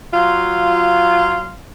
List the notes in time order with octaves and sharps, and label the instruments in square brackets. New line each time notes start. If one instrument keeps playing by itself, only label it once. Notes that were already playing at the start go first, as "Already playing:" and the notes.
[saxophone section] F#3 F4